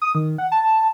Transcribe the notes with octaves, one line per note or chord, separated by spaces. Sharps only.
D#6
D#3
F#5
A5